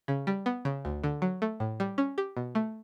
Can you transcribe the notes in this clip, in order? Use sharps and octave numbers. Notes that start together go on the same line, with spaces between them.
C#3
G3
B3
C#3
D2
D3
F#3
A3
A2
G3
C#4
G4
B2
A3